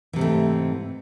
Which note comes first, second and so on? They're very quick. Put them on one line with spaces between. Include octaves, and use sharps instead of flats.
E3 C3 G#2 A3